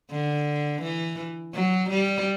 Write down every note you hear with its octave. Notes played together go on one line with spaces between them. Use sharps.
D3
E3
F#3
G3